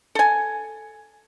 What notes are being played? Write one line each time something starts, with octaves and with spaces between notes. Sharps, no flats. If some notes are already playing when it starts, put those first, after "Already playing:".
A4 G#5